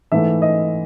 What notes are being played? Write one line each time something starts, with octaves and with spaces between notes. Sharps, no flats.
G#2 E3 A3 E5
D#5